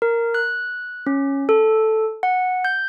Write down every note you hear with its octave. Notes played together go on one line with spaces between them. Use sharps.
A#4
F#6
C#4
A4
F#5
G6